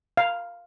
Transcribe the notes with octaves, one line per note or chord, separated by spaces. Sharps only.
F5